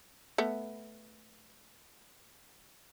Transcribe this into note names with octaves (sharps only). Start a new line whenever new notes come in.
A3 B3